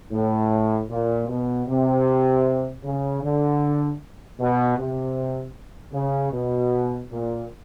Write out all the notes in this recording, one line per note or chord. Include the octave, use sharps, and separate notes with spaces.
A2
A#2
B2
C3
C#3
D3
B2
C3
C#3
B2
A#2